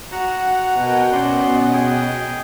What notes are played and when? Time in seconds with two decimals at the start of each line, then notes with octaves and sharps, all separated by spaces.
0.12 F#4 F#5 A#5
0.76 B2 A#4 G5 G#5
1.12 B2 B3 C#4 D5 D#5 C6
1.73 G#4 G5